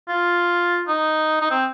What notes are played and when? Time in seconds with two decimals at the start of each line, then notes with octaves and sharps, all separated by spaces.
0.08 F4
0.88 D#4
1.41 D#4
1.51 C4